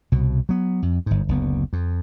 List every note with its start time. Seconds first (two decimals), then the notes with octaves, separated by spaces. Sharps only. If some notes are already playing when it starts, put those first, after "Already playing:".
0.12 C2 B2
0.49 F#3 B3
0.83 F2
1.06 G1 G#2
1.29 F#1 D2 B3
1.73 F2